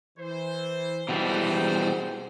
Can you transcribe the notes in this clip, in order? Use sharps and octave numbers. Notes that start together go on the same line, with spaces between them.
E3 C5
B2 E3 G3 G#3 C5